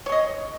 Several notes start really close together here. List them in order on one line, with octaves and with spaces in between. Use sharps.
C#5 G#4 D#5